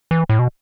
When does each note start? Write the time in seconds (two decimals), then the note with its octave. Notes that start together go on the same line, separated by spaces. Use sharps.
0.11 E3
0.29 A2
0.39 B2